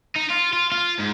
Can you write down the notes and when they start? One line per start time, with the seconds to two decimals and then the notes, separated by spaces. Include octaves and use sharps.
0.16 D#4
0.30 F4
0.53 F4
0.72 F4
0.99 G#2